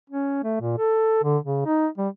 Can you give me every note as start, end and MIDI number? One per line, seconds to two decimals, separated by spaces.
0.10 0.39 61
0.44 0.60 57
0.61 0.73 46
0.78 1.19 69
1.24 1.38 50
1.45 1.64 49
1.66 1.87 63
1.98 2.08 55